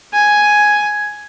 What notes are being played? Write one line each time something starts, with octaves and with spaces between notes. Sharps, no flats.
G#5